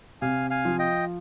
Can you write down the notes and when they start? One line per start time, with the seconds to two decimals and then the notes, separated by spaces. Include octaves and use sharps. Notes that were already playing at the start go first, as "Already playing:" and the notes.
0.22 C3 F5 G#5
0.50 F5 G#5
0.65 F3
0.79 D#5 G5